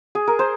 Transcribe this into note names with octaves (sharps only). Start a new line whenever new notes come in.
G#4
A#4
C5